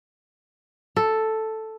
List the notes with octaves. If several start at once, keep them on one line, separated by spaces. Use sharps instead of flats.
A4